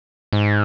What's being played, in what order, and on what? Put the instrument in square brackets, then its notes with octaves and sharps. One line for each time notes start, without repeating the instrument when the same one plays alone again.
[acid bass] G#2